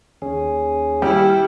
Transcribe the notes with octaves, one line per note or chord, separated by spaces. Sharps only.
D#2 C#4 G#4
G3 E4 G4